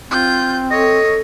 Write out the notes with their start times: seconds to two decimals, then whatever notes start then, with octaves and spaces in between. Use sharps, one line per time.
0.11 C4 F4 G6
0.71 A4 C#5 D#5